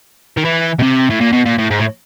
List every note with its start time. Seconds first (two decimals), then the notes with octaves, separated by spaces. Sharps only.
0.37 D#3
0.45 E3
0.79 B2
0.82 C3
1.10 A2
1.21 A#2
1.33 B2
1.46 A#2
1.59 A2
1.71 G#2
1.80 A2